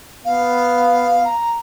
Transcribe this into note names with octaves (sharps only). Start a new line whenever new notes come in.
B3 F5
A#5